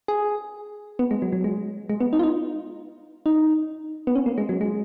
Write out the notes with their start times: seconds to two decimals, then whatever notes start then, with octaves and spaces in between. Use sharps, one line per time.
0.08 G#4
0.99 B3
1.11 G#3
1.22 F#3
1.32 F#3
1.44 G#3
1.90 G#3
2.00 B3
2.13 D#4
2.19 F4
2.23 D#4
3.26 D#4
4.07 B3
4.15 C#4
4.26 A#3
4.38 G#3
4.49 F#3
4.61 G#3